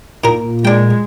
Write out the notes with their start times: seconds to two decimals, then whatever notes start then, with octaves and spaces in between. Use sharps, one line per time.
0.24 A#2 D#3 A#4
0.65 G#3 D4 G5